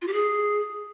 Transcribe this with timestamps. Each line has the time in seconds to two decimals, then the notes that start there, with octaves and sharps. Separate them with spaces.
0.02 F4
0.07 G4
0.13 G#4